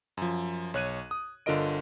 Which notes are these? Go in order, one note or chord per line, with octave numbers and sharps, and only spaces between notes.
F#2 F3
B1 C#5 F#6 G#6 D#7
D#6
G1 D3 F4 A#4 D#5 D7